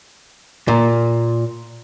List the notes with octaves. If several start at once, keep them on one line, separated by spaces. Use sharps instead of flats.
A#2